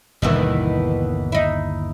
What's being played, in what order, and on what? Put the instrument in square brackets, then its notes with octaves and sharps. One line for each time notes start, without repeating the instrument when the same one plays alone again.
[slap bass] G1 D#2 [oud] B2 D#3 E3
[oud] D#4 E4